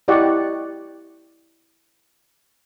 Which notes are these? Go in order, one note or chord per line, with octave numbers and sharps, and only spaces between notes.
E4 G4 D5 D#5 F#5 C#6